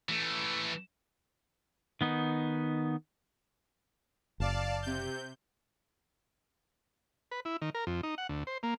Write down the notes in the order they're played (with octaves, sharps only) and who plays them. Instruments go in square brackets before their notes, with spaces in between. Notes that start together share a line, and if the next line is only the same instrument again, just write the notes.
[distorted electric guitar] E3 A3
[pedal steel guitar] D#3 B3 D#4
[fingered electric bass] F#1 [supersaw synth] D5 F5 A5
[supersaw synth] C3 G6
[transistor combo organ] B4
E4
D#3
A#4
F2
D#4
F#5
D2
C5
A#3